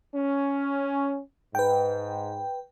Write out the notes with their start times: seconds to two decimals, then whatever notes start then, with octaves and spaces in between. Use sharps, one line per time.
0.15 C#4
1.55 G#2 B4 G5